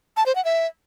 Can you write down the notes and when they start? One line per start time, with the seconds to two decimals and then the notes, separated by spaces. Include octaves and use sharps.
0.17 A5
0.26 C5
0.35 F#5
0.45 E5